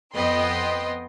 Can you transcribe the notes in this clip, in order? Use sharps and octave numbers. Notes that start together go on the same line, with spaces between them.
F2 B3 D#5 G5 C6